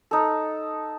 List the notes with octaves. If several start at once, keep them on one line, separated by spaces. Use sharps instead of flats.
D#4 A4